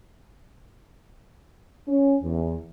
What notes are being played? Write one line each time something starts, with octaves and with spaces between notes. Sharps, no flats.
C#4
E2